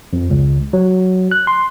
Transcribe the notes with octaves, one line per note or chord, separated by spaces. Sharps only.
F2
C#2
F#3
F#6
C6